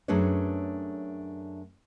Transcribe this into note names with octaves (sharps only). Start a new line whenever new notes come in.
F#2 A3 D4 G#4 B4 C#5